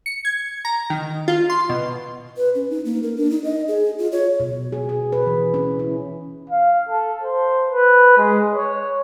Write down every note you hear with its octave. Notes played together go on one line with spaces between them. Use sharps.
C#7
G#6
A#5
D#3
F4
C6
B2
B4
C#4
D#4
A#3
A#4
D4
D#4
D#5
G#4
F4
C#5
B2
G#4
G#4
B4
E3
C#4
E4
F5
A4
C5
B4
G#3
C#5